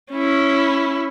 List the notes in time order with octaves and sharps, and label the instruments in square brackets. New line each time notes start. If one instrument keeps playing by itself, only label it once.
[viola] C#4 E4